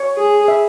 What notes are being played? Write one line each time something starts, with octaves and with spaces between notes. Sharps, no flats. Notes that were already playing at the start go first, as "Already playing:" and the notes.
Already playing: C#5
G#4
E5